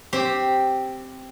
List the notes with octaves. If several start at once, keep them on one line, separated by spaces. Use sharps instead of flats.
C4 G4